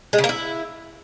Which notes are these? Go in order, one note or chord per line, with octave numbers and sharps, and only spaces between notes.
G#3
C#3
A#3
E4